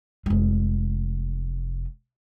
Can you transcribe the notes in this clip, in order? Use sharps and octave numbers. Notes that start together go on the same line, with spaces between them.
F1 G#3